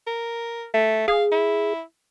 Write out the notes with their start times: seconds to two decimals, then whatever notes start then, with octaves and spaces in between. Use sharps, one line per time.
0.07 A#4
0.74 A3
1.08 G#4 F5
1.32 E4